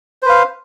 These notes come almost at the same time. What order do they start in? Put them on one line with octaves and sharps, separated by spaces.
C5 B4 F5